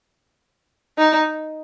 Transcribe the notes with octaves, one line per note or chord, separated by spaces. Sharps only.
D#4